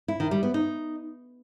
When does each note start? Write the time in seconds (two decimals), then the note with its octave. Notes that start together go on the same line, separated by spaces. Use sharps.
0.08 E4
0.20 D#3
0.31 G3
0.43 B3
0.54 D#4